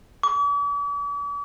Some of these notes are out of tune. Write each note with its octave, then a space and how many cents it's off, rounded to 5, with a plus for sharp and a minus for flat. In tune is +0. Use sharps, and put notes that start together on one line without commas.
D6 -45